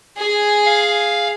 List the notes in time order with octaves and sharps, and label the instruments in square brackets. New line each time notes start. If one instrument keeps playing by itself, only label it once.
[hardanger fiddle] G#4 G#5
[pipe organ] F5